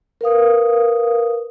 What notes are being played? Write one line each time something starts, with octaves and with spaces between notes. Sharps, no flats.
A#4 B4 F5 D#6